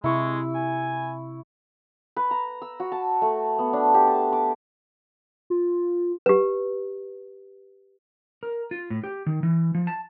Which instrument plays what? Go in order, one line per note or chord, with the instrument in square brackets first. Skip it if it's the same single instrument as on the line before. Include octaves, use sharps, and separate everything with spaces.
[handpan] C3 [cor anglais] G#3 [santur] E4 C#6
[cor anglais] G#5
[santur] B4
A#5
E6
F#4
A5
A3
B3
D4
G4
A5
D6
[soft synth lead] F4
[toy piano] G4 B4
[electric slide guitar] A#4
F4
A2
G4
D#3
E3
F3
A5